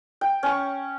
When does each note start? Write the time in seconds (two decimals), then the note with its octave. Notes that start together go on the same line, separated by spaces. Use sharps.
0.21 G5
0.43 C#4 C#6